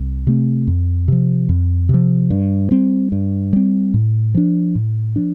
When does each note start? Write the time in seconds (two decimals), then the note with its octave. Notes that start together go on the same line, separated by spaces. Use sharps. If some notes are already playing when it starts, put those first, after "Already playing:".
Already playing: C2
0.27 C3 A3 C4
0.67 F2
1.08 C3 F3
1.49 F2
1.89 C3 F3
2.30 G2
2.71 G3 C4
3.12 G2
3.53 G3 C4
3.94 A2
4.34 F3 D4
4.75 A2
5.16 F3 D4